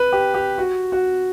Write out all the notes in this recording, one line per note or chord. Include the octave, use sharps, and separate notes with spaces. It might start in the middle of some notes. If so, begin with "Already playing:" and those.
Already playing: B4
G4
G4
F#4
F#4